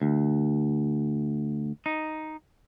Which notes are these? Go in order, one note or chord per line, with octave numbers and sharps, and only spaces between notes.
D2
D#4